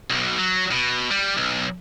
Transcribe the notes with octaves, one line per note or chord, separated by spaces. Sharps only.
B1 B2
F#3
B2
G3
B1